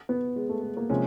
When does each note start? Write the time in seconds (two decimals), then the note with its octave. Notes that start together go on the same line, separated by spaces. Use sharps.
0.09 B3
0.36 G#3
0.49 A3
0.63 A3
0.77 A#3
0.90 C3 F3 G#3 C#4